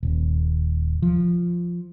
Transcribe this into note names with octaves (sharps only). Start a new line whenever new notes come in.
D#1
F3